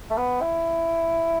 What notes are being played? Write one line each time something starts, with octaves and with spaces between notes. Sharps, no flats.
A3
B3
E4